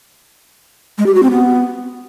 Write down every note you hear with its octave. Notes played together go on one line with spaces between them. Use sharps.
G#3
G4
F#4
C4
B3